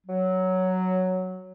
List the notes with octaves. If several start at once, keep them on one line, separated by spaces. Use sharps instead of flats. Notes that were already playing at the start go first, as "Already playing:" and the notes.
F#3